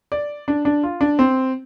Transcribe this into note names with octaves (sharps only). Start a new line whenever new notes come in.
D5
D4
D4
F4
D4
C4